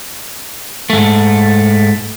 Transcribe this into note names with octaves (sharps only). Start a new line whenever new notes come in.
G#2 A3